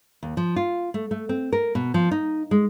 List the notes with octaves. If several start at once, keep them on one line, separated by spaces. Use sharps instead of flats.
D#2
F3
F4
A3
A3
C4
A#4
B2
F3
D#4
G#3